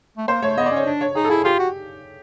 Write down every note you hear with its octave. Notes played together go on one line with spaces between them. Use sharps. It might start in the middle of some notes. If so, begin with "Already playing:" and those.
A3
A#3 C5
A3 C#5
B3 D#5
D5
C#4 C#5
D4
C#5
D#4 G#4
A4
E4 G#4
F4 G4
F#4